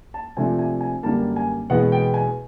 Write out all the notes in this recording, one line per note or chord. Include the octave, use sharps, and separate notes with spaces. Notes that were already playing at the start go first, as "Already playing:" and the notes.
A5
C3 F3 A3 D4 G#5
G#5
G#5
F#2 D3 G3 A#3 A5
G#5
E2 B2 G#3 B3 F#5
G5
G#5